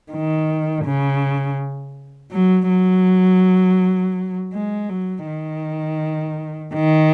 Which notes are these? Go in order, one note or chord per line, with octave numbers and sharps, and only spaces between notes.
D#3
C#3
F#3
F#3
G#3
F#3
D#3
D#3